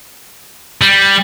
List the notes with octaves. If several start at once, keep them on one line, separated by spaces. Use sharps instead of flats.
G3